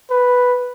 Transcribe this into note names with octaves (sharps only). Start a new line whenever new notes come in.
B4